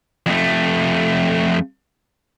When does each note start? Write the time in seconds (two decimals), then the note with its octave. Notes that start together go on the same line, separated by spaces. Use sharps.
0.26 F2 A3